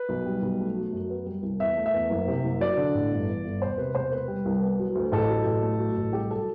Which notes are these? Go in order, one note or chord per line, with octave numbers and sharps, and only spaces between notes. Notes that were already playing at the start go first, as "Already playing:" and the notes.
Already playing: B4
B1
G3
B1
A3
F#3
F#2
B3
G3
C2
E2 E5
A3
E5
E2
F#1
C3
F#1
F#3 D5
D3
A1
G1
E3
G1
E1 C5
C3 B4
E1 C5
B3 B4
G3
C2
B3
F#3
D2
A1 A4
F#3
A1
A3
F#3
A1
C2 G4
F#3 A4